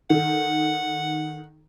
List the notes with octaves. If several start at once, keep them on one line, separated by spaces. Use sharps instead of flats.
D#3 A4 F#5